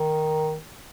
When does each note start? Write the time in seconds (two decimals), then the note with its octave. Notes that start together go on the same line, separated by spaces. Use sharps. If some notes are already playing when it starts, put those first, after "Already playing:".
Already playing: D#3